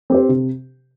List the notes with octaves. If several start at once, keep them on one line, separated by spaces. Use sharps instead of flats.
C4 G4 C5
C3